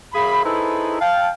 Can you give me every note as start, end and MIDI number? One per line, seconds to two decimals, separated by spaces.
0.13 0.43 42
0.13 0.43 68
0.13 0.43 77
0.13 0.43 83
0.44 0.99 63
0.44 0.99 64
0.44 0.99 68
0.44 0.99 69
0.44 0.99 71
0.44 0.99 72
1.01 1.30 77
1.01 1.30 79
1.01 1.30 81